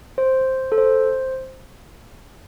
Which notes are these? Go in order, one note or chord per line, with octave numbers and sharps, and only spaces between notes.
C5
A4
C5